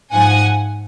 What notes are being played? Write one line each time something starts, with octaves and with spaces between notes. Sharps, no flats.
G#2 F3 F#5 G#5